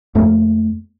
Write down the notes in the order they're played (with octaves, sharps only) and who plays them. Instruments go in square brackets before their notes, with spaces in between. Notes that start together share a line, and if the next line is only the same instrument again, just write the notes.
[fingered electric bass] F2 A3 A#3